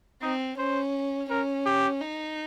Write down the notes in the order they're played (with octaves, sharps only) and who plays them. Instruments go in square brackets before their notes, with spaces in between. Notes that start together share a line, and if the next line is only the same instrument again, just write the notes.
[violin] C4 [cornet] D#4
[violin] C#4 [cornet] C5
[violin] C#4 [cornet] A#4
[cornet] G4
[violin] D#4